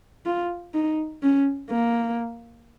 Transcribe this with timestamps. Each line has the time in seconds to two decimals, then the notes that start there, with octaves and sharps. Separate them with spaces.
0.26 F4
0.74 D#4
1.22 C#4
1.70 A#3